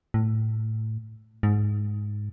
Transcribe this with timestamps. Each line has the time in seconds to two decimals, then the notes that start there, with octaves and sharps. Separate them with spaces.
0.14 A2
1.43 G#2